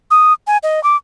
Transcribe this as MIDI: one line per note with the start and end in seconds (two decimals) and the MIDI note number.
0.11 0.33 87
0.47 0.57 80
0.63 0.82 75
0.84 0.96 86